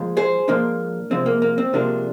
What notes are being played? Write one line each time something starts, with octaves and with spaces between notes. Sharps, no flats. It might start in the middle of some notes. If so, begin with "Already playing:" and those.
Already playing: A#2 F3 G#3
G#4 C5
A#2 F3 G#3 A#3 D4
C3 F3 G#3 C4
A#3
A#3
C4
C3 F3 G#3 A#3 D4